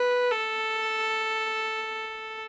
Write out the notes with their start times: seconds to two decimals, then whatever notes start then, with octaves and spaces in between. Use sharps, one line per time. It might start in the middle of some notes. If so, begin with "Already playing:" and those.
Already playing: B4
0.31 A4